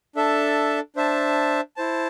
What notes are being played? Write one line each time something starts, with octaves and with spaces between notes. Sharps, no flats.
D4 A4 E5 A5
D4 C5 E5 A5
E4 C5 A5